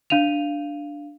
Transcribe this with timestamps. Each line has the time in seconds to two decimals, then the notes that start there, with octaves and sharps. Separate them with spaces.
0.10 D4 F5 D#7 F7